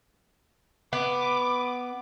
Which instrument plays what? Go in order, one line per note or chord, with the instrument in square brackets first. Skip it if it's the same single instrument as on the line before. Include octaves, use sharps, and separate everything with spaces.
[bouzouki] B3 [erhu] D6